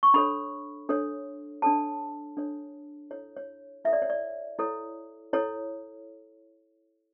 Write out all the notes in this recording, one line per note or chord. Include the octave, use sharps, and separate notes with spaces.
C#6
D4 A4 C#5 B5
D4 A4 C#5
D4 A4 C#5 A5
D4 A4 C#5
E4 A4 C#5
C#5
E4 A4 C#5 E5
D5
C#5
D5
E4 A4 C#5
E4 A4 C#5